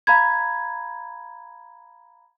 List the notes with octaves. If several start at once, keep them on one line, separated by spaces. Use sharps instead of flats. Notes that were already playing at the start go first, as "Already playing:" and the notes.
F5 A#5 B5 G#6